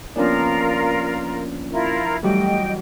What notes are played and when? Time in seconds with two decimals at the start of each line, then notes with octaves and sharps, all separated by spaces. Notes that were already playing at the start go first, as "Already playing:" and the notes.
0.16 F3 A#3 B3 C#4 D4 F4 A#4 D5
1.72 E4 F4 A#4
2.23 E3 F#3 G3 A3 G4 D#5 G5